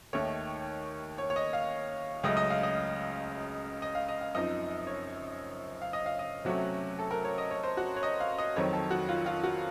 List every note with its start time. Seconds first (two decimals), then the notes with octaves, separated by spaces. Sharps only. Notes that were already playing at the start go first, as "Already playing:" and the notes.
0.13 D#2 D#3 A3 C#5
1.18 C#5
1.30 C#5
1.36 D#5
1.53 F5
2.23 C#2 C#3 F#3 A3 D#5
2.37 D#5
2.50 F5
2.63 D#5
3.82 D#5
3.95 F5
4.09 D#5
4.21 F5
4.35 F#2 F3 C4 D#4 D#5
4.87 C#5
5.82 F5
5.93 D#5
6.06 F5
6.19 D#5
6.45 C3 F#3 A3 C#4 F#4
6.99 A4
7.11 A#4
7.25 C#5
7.38 D#5
7.51 C#5
7.64 C5
7.77 F#4
7.96 C#5
8.03 D#5
8.20 F5
8.38 D#5
8.56 F2 D#3 F#3 C4 C#5
8.73 A4
8.91 F#4
9.09 F4
9.26 F4
9.43 F#4